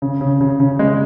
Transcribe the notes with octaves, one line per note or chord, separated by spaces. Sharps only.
C#3
C#3
C#3
C#3
G#3